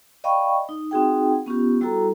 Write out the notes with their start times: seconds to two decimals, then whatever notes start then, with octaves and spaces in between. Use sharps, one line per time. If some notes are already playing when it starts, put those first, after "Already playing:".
0.24 D5 D#5 F5 G5 B5 C#6
0.69 D#4
0.91 C4 D#4 F#4 G#4 F#5 G5
1.46 B3 C#4 F4 G4
1.81 G3 E4 F#4 A4 A#5